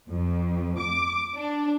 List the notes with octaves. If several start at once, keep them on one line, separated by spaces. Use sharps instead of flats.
F2
D6
D4